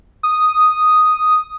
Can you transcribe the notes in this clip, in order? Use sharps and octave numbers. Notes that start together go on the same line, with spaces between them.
D#6